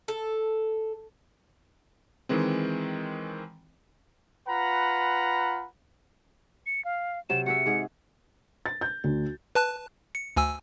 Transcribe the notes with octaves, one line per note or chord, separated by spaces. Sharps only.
A4
D#3 E3 G#3 C4
F4 B4 F#5 A#5 B5
C#7
F5
C3 F#3 E7
F#4 G#4 E5 C#7
G#2 G#4
A6
G6
D2
B4 A5 F#6
C#7
D2 G#5 E6